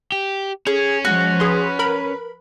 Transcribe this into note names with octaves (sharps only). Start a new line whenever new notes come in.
G4
C#4 G#4
F3 G#3 F#4
G#4 B4 C6
A#4 B5